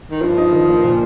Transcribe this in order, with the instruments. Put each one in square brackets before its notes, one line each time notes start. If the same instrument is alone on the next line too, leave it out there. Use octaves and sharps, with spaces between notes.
[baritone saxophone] D#3
[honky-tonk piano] G2 [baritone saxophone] F3
[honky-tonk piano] D#4
D#3
A#3
A#2